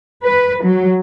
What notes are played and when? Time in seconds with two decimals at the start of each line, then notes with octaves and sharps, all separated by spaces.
0.23 B4
0.64 F#3